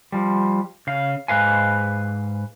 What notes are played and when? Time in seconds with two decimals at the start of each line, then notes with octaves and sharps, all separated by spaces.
0.12 F3 G3
0.87 C#3 F5
1.28 G#2 B4 F5 G#5